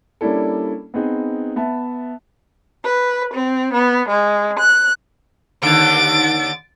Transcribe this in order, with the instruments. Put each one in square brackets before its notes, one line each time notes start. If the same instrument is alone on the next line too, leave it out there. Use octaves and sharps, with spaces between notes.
[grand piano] G3 A#3 C#4 D4 E4 A4
B3 C4 D#4 G#4
B3 E5 A5
[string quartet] B4
C4
B3
G#3
F#6
[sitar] D#2 D3 [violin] A6 D7